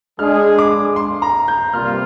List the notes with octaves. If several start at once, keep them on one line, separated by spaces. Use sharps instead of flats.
G#3 D4 G#4 F6
D6
C6
A#5
G6
C3 G3 A#3 F4 F6